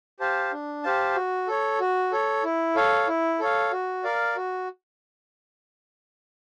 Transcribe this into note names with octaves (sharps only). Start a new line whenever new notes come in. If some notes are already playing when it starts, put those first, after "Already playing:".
G4 C5 F5 A5
D4
G4 C5 F5 A5
F#4
A4 C#5
F#4
A4 C#5
E4
A4 C#5 F5
E4
A4 C#5 F5
F#4
A#4 D5 F5
F#4